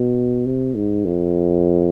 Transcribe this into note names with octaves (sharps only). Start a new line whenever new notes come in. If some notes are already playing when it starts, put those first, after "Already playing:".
Already playing: B2
C3
G#2
F2